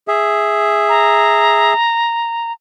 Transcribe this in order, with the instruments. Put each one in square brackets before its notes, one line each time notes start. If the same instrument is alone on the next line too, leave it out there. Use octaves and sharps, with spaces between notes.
[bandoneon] G#4 E5
[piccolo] A#5